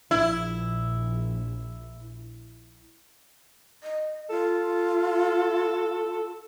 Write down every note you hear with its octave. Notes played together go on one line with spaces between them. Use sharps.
A#1 E4
D#5
F4 A4